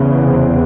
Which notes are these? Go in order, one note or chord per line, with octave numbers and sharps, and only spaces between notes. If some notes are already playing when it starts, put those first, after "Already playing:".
Already playing: E2 C#3
C3 C4